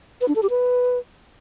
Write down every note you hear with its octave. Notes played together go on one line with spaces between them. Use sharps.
B4
D4
A4
G4
B4